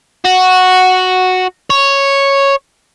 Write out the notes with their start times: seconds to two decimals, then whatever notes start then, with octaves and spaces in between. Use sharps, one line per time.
0.25 F#4
1.70 C#5